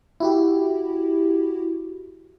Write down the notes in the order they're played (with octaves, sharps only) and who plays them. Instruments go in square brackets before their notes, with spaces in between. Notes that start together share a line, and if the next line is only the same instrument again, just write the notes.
[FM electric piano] E4 F#4 G4